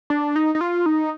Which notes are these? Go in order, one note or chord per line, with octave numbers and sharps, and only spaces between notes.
D4
D#4
D#4
F4
D#4